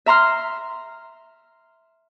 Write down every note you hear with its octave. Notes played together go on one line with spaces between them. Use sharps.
E5 A#5 C6 F6